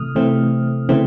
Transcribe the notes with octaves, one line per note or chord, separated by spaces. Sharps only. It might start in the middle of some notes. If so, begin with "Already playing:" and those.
Already playing: C3 E3 A3 D#6 F6
C3 E3 A3 C4
C#3 E3 A3 C4